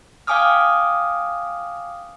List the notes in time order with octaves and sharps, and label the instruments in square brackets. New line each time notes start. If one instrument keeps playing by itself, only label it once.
[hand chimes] F5 G5 G#5 D6 D#6 F6